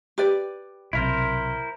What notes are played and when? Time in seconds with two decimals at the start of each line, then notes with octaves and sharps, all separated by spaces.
0.18 G4 B4 D5
0.93 B1 C3 E4 A#4 C5